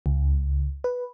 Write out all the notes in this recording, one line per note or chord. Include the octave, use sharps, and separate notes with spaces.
C#2
B4